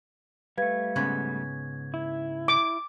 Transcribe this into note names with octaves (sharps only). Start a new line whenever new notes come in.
G3 A3 B4 F5 G#6
G#2 C#3 B3 G#6
E4
D6